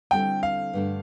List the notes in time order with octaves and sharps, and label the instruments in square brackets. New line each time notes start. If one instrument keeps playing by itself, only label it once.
[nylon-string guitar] D3 G3 C4 E4 A4 [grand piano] G5
[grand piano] F5
[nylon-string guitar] G2 D3 A3 D4 A4